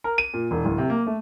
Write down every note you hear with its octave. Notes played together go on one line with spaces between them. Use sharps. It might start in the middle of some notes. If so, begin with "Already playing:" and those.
A#4
D#7
A#2
E1
D1
C3
A#3
A3